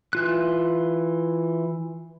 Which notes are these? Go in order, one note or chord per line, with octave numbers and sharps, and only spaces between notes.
E3 F4 F#6